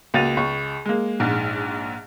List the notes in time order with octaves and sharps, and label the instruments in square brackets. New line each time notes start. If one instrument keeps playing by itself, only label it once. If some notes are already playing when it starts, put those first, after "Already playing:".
[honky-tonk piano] C#2 A#3 F#4 A6 D#7 F7
C#2 C#6
G#3 A#3
A#1 G#2